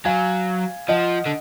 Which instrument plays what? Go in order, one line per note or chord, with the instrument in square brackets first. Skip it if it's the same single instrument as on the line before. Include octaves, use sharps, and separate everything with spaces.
[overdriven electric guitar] F#3 [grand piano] F5 G#5
[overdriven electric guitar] F3 [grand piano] D#5 F#5
[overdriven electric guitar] D3